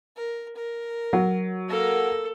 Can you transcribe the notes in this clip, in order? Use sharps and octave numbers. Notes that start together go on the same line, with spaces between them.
A#4
A#4
F#3
A#3 A4 A#4